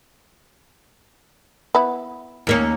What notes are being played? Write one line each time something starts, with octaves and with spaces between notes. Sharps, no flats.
B3 E4
D#2 A#3 C#4